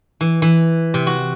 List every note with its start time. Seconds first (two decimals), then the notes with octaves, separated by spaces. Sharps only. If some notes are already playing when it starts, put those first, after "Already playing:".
0.21 E3
0.42 E3
0.94 C3
1.07 F#4